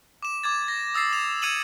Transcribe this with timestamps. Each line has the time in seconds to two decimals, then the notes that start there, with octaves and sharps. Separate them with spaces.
0.23 D6 E7
0.44 D6 G#6 A6
0.68 A#6
0.94 D#6 E6 A6 C7
1.13 E7 F7
1.42 E6 G#6 C#7 D#7 E7 F#7